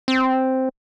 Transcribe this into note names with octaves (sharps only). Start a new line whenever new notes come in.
C4